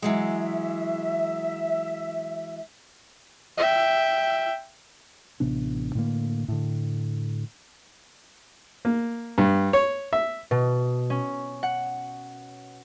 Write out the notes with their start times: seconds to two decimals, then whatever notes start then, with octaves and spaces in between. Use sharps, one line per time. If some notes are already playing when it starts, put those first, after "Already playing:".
0.02 E3 F#3 G#3 E5
3.58 E5 G5
5.40 A1 C3 B3 D4
5.95 A2 D3 A#3
6.48 A2 D3
8.85 A#3
9.38 G2
9.73 C#5
10.13 E5
10.51 B2
11.10 C#4
11.63 F#5